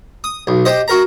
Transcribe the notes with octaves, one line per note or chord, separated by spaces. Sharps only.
D#6
B1
G4 C5 D#5
F#4 A#4 A#5